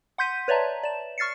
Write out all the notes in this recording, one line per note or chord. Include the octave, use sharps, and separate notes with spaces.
F#5 C6 G6 B6 D#7
B4 C#5 D5 E5 A5 A#5
D5 E7
C#6 F6 A6 C7 C#7